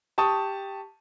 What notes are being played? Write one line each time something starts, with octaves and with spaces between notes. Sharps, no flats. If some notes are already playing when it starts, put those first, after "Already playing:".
G4 A5 C#6 D#6